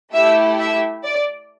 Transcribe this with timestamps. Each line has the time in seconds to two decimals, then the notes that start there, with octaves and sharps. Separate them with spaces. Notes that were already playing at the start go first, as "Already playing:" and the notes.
0.14 A3 E4 G4 E5
0.58 E5
1.04 D5